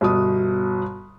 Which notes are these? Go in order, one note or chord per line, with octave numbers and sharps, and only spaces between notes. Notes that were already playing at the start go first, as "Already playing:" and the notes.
G1 B2 D#6